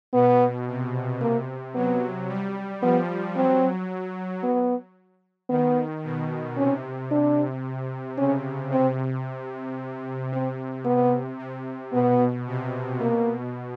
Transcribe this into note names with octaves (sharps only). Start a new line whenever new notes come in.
B2 B3
C3
C3 A#3
F#3 B3
G3
F3 B3
F#3 C4
B3
D#3 B3
B2
C3 C#4
D4
C#3 C#4
C3 C4
C3 C4
B3
C3
B2 B3
C3
B2 A#3